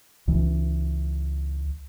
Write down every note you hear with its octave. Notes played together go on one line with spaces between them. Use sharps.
C#2 E3